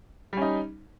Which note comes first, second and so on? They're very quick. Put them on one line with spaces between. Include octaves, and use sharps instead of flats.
G3 C#4 D#4